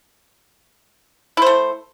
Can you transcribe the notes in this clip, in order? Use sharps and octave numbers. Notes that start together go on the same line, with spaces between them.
A3 E4 C5